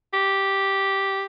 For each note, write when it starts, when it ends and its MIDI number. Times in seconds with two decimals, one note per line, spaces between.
0.13 1.24 67